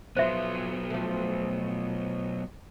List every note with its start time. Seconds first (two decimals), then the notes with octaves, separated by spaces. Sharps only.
0.17 F3 F#3 B3 C5 E5
0.90 F3 A3